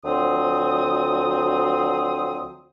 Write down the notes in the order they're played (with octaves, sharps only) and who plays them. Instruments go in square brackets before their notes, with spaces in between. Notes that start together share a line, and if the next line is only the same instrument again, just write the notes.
[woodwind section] D2 F3 F#3 C4 D#6